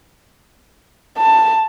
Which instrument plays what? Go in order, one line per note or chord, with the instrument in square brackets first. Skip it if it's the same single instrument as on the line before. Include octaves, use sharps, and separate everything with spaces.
[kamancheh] A5